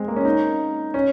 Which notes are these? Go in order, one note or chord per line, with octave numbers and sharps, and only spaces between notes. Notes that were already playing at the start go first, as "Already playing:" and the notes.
Already playing: G#3 C4
A#3
C#4
D#4
C#4